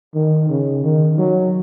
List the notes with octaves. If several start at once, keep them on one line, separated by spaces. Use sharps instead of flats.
D#3
C#3
D#3
F#3